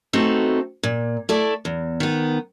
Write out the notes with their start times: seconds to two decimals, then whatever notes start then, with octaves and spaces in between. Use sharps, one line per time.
0.13 A3 B3 C4 D#4 F#4 A4
0.83 A#2
1.29 A3 E4 A4 D5
1.65 E2
2.00 D#3 B3